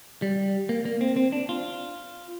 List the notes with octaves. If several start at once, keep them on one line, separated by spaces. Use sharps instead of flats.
G3
A#3
A#3
C4
C4
D4
F4